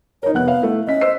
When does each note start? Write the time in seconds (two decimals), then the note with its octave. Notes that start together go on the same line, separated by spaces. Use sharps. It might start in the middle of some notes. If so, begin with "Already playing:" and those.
0.23 D#4 A#4 C#5
0.34 F1 B3 F#5 F#6
0.48 F5
0.62 A3 E4
0.87 C#4 D#5 B6
1.01 C5 E6 C7